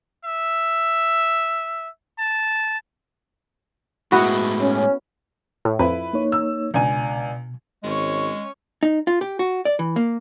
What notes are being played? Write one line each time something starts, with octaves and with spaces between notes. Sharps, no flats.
E5
A5
A2 G#3 B3 E4 F#4
C#4
A2
F2 E4 B4
A#3 D#4 C#5
E6
C#2 B2 D4 G#5
G#1 G#3 C#4 C#5
D#4
F4
G4
F#4
D5
E3
A#3